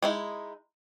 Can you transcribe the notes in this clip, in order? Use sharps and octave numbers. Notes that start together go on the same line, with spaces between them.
G#3 D#4 E4